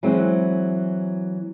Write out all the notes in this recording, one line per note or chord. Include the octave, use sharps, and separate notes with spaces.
E3 F#3 G#3 C4